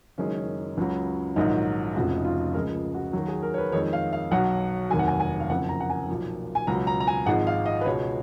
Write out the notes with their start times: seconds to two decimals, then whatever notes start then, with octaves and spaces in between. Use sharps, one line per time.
0.18 F#1 F#2 D#3 G#3 C#4
0.77 C#2 C#3 F#3
1.36 A#1 G#2 D#3 F#3 D#4
1.95 F1 F2 C#3 F3 G#3 F#4
2.17 D#4
2.25 F4
2.54 C#2 C#3 F3 G#3 A#4
2.94 F#4
3.13 D#2 D#3 F#3
3.28 G#4
3.42 A#4
3.54 C#5
3.58 B4
3.72 F2 D#3 G#3 C#5
3.93 F5
4.13 F5
4.31 B1 B2 F#3 F#5
4.90 F1 D#2 D#3 F#3 G#5
4.99 F#5
5.07 G#5
5.20 G#5
5.40 F5
5.49 F#1 F2 C#3 F#3 F#5
5.69 A#5
5.80 F#5
5.90 G#5
6.09 B1 A#2 F3
6.55 G#5
6.67 C#2 B2 F#3 A#5
6.87 A#5
7.00 A#5
7.07 G#5
7.26 G#1 G#2 F3 G#3 F#5
7.47 F5
7.66 D#5
7.81 B4
7.86 C#2 B2 G#3 C#5